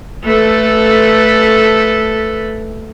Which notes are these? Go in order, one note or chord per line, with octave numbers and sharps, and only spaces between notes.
A3 A4 B4